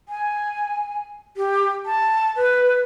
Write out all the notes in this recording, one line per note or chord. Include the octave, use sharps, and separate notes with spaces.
G#5
G4
A5
B4